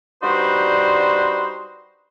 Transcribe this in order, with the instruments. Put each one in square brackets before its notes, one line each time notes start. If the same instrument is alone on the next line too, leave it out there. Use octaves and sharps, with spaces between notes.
[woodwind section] G3 D4 D#4 F#4 B4 C5